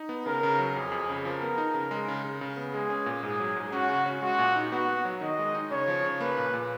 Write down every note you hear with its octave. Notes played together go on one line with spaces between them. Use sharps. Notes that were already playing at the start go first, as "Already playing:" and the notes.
Already playing: D#4
B3
C#3 A#4
C#3
F#3
F2 G#4
F2
C#3
F3 A#4
B3
D#4
C#3
G#3
C#3
C#3
C#3
B3
G#3 G#4
C#4
A#2
G#2 G#4
F#3
G#2
C#4 F#4
C#3
C#4
G#3 F#4
A#2
D#4
B3 F#4
B3
F#3
D#3 D#5
G#3
D#4
C#3 C#5
F3
C#3
A#3 B4
A#2
A#2